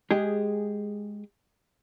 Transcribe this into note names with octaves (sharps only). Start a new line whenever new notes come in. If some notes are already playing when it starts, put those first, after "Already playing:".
G#3 G4 G#4